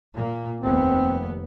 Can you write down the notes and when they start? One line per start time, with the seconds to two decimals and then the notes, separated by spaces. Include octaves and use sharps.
0.15 A#2 A#3
0.61 F1 D#2 B3 C4